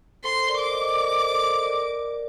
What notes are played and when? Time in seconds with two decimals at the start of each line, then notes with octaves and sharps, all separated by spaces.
0.24 A4 C5 C6
0.47 A#4 D5
0.59 D6
0.71 C5 D#5
0.94 A#4 D5
1.28 A4 C5
1.63 A#4 D5